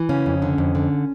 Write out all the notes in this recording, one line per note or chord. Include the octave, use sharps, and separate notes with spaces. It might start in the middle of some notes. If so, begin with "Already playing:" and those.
Already playing: E3
C#3 C#4
F2
D3
F2
D3